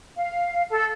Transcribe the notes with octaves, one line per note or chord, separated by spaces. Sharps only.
F5
A4